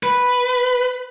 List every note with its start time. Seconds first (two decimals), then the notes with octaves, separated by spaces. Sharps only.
0.03 B4